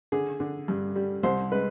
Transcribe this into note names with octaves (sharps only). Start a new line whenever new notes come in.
D3 G#4
D3
G2
G3
C2 C5
G#3 B4